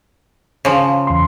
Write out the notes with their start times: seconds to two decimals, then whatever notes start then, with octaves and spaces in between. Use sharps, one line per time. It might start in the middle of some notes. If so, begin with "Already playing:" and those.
0.65 C#3 F3
1.07 E2 C6